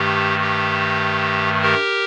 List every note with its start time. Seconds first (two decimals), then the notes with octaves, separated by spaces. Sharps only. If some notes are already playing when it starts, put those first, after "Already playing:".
Already playing: G2 D#3 A3 G4
0.41 G4
1.62 G4 A#4